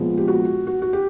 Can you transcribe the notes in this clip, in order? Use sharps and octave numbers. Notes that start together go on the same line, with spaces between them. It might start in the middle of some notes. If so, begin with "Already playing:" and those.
Already playing: A#2 F3 G#3 B3
G4
F#4
F#4
F#4
G4